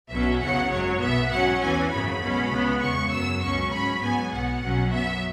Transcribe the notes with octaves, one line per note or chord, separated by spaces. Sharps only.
B1 B2 F#3 C#4 E5
E2 C#3 F#3 F#5
G#1 F#2 F#3 C#5
B1 B2 B3 E5
G#2 F#3 C#4 F#5
E2 E3 C#4 G#5
G#1 F#2 C#3 F#3 B5
B1 B2 G#3 C#4
C#2 C#3 G#3 B3
E2 C#3 G#3 C#6
F#2 F#3 B3 E6
C#2 B2 F#3 C#4 C#6
G#2 F#3 C#4 B5
G#2 F#3 B3 G#5
B1 B2 B3 F#5
B1 B2 F#3 C#4
F#2 F#3 B3 E5